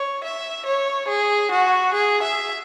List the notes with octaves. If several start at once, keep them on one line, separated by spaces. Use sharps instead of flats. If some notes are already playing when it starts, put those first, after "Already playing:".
Already playing: C#5
E5
C#5
G#4
F#4
G#4
E5